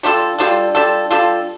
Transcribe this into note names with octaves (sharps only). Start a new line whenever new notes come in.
G3 D4 F4 A4
G3 D4 F4 A4
G3 D4 F4 A4
G3 D4 F4 A4